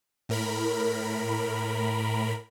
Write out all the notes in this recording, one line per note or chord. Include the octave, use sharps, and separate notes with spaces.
A2 A#4 B5